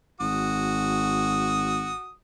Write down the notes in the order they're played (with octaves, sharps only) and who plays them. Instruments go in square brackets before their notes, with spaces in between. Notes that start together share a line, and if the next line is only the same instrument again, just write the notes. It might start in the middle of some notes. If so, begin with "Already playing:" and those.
[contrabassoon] G#1 [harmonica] F#4 D#6